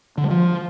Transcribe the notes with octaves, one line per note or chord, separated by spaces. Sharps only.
D3
G3
F3